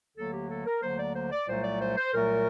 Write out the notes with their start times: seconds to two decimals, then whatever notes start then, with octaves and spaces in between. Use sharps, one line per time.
0.17 D2 D3 F#3 A#3 A4
0.33 G4
0.50 A4
0.66 A#4
0.83 D2 D3 F#3 A#3 C5
0.99 D5
1.15 C5
1.32 D5
1.48 C2 A#2 F#3 A3 C5
1.64 D5
1.80 C5
1.97 C5
2.13 C2 A#2 F#3 A3 A#4